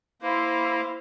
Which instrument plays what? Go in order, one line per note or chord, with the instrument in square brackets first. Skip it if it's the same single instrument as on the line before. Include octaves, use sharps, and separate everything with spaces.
[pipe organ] A#3 [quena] E4 [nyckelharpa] C5